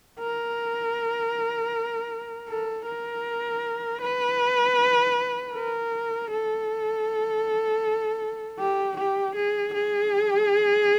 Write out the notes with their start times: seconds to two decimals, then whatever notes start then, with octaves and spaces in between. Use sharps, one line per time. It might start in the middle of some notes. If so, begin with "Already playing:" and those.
0.20 A#4
2.49 A4
2.86 A#4
4.02 B4
5.54 A#4
6.30 A4
8.59 G4
8.97 G4
9.35 G#4
9.74 G#4